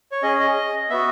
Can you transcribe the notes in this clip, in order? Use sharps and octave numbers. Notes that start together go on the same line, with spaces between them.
C#5
C#4 G#4 D#5
D#5
B3 F#4 E5